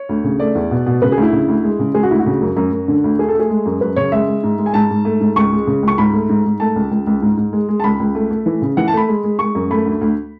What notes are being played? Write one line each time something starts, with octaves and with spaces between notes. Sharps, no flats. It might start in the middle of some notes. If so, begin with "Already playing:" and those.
Already playing: C#5
D2
C#3
A3 D5
E2
B2
B2
C#3 B4
G#4
D2
E4
C#3
D2
G#3
C#3
G#3 G#4
F#4
D2 E4
F#4
C#3
F#2
F#2
F#2
D3
D2
A3 G#4
A4
A3 G#4
G#3
F#2
F#2 B4
C#3 C#5
G#3 E5
G#3
G#2
G#3
G#5
G#2 A5
G#2
A3
G#2
C#2 C#6
G#3
C#3
C#2
C#6
G#2 B5
A3
G#2
G#2
A3 A5
C#2
C#2
C#2
G#2
G#2
G#3
G#3
A5
C#2 B5
C#2
A3
A3
E3
C#3
E3 F#5
A5
A3 B5
G#3
G#3
G#3 C#6
F#2
A3 B5
D2
D2